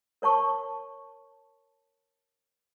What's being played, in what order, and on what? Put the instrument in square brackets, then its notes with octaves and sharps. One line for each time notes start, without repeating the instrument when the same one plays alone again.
[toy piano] A#4 C#5 A5 C#6